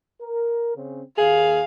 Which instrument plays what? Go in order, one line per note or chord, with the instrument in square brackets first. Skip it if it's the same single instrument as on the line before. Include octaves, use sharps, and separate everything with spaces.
[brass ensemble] A#4
C#3 C4 C#4
[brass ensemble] D#2 [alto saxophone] G#4 [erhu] F5